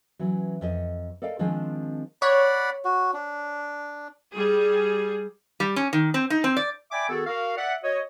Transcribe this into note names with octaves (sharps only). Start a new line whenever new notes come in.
E3 F#3 C#4
F2 D#5
A4 A#4 D5 D#5 F5 G5
D#3 F3 G#3 C4 D4 G#4
C#5 D5 F#5 B5
F#4
D4
G3 G#4
G3
C#4
D#3
C4
D#4
C4
D5
D5 E5 G5 G#5 B5 D6
D#3 B3 F#4 G#4 A4
F#4 A#4 F5
D5 E5 F#5
F#4 C#5 D#5